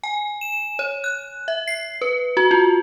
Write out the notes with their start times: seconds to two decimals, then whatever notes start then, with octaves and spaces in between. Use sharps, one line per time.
0.03 G#5
0.41 E7
0.79 C#5
1.04 F#6
1.48 E5
1.68 C7
2.01 B4
2.37 F#4
2.51 F4